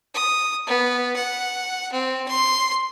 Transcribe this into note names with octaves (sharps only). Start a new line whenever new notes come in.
D#6
B3
F#5
C4
C6